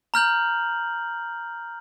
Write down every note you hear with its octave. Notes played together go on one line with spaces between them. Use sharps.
A#5 F6 G6 F#7